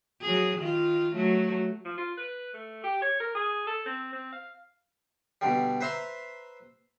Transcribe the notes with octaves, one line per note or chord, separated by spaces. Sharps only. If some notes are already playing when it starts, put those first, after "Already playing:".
F#3 G#4
D#3 F4
F#3 A3
F3
F4
B4
A3
G4
C#5
A#4
G#4
A4
C4
C4
F5
B2 D3 G3
B4 C5 E5 A#5 C6